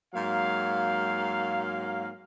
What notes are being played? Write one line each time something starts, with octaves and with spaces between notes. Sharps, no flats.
G#2 F#3 A#3 F5